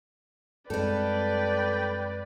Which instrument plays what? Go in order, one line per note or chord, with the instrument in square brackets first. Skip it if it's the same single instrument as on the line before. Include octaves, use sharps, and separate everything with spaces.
[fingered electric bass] F#2 G#3 C4 [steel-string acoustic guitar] G3 A4 [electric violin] B4 D5 [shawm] G5